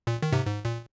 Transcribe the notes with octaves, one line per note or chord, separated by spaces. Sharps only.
A#2
D#3
G#2 C3
G#2
A#2